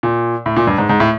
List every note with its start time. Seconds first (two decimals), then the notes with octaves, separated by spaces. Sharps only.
0.03 A#2
0.46 A2
0.56 A#2
0.67 G2
0.78 G#2
0.89 G#2
1.00 A2